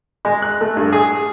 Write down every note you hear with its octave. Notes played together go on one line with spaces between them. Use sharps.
G#3
F#6
A3
G2
G#4